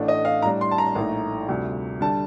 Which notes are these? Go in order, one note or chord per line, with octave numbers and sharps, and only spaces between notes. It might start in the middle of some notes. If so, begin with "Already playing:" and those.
Already playing: A1 A2 A3 D4
D#5
F5
A2 G3 D4 A#5
C6
A5
A#5
A#1 A2 A3 D#4
D2 C3 G3
D3 G3 A5